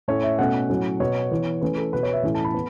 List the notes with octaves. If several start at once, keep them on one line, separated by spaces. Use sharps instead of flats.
A2 A3 C#4 C#5
E5
B2 A3 C#4 F#5
A2 F#3 C#4
B2 B3 C#5
E3 B3
E3 A3 C#4 B4
A4
B2 B3 B4
C#5
E5
A2 E3 A3 C#4
A5
B5
B3